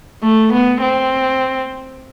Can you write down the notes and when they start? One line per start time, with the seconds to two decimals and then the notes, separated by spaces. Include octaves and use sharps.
0.23 A3
0.52 B3
0.82 C4